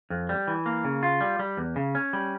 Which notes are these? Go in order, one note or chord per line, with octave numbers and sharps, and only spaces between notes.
F2
G3
E3
A#3
C#3
F4
G3
G3
E2
C#3
C#4
G3